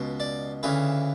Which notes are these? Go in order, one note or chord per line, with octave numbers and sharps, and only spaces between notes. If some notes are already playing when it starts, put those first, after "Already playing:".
Already playing: C#2 B2
D5
D2 C#3 E3 B4